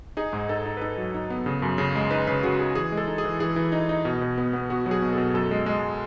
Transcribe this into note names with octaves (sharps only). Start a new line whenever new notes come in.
D#4 G#4
G#2
D#4 A4
D#4
B4
D#4 A4
F#3
D#4
B3
C#3
F#2
C#3
G#3
D#4 B4
C#3 B4
C#3 F#4
D#4 G#4
E3 G#4
G#3
A4
D#4
G#4
E3
E3 G#4
E3
D#4
D#4
B2
B2
B3
B3
B3 F#4
F#3
G#4
B2
A4
B2
F#2 A4
G#3
G#3